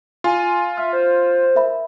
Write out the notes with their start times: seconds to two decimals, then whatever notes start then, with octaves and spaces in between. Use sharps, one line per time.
0.24 F4 G#5
0.78 E5 F6
0.93 C5
1.56 A#4 E5 B5